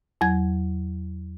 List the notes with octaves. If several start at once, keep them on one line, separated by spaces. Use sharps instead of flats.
E2 F#3 G#6